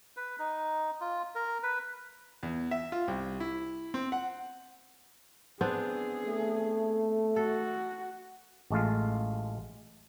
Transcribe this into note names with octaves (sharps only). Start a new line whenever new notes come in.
B4
D#4
F4
A#4
B4
E2
E5
F4
C2
E4
C4
F#5
B3 C4 D4 G#4
A3
F#4 A4
A1 G#3 A3 F4 F5